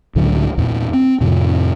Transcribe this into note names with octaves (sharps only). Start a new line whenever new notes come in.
C#2 A2 D3 F#3
E2 A#2
C4
F2 A2 C3 F3